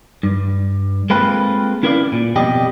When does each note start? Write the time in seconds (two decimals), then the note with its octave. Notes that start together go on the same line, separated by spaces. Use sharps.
0.23 G2
1.10 G#3 A#3 C4 F4 A4 B4
1.83 C#4 E4 A#4 B4 D5 F5
2.12 A#2
2.36 F2 B2 G3 G4 D#5